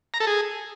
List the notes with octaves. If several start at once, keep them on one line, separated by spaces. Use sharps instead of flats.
A#5
A4
G#4